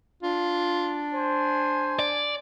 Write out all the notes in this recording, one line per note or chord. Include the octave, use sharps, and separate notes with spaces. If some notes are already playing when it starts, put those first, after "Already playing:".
D4 F4
C5 G#5
D5